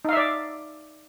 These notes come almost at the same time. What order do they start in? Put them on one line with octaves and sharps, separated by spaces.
D#4 F5 E5 D5